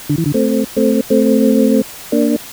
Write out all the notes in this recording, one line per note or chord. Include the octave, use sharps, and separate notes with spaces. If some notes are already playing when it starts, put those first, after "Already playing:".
D3
E3
D3
A3 C4
A3 C4
A3 C4
A#3 D4